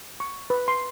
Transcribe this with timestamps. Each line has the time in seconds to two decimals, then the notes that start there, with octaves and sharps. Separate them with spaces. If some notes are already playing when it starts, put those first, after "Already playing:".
0.20 C#6
0.50 B4
0.68 C6